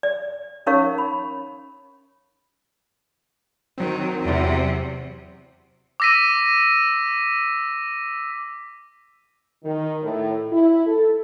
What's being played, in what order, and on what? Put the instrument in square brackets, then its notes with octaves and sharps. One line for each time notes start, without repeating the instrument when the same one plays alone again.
[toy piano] D5
C#4 D#4 A#4 C#5 F5 C#6
B5
[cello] D#3 [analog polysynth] F#3 C4
[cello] E2 C3
[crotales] D6 E6 A#6 B6 D#7
[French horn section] D#3
A2
E4
A4